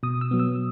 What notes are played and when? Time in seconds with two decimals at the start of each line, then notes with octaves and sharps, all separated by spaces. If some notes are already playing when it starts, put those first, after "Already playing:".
0.03 B2 D#6
0.21 E6
0.31 F#3 B3
0.39 E6